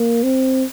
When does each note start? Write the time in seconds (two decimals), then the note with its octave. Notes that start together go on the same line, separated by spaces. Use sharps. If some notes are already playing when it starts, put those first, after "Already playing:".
Already playing: A#3
0.23 C4